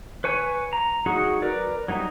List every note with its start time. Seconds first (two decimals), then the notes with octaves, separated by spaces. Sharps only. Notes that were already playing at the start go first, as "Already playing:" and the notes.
0.24 B4 C#5 G#5
0.73 A#5
1.06 F#3 D#4 F#4 G#4
1.42 A#4 B4 D5
1.88 F#3 G3 D#4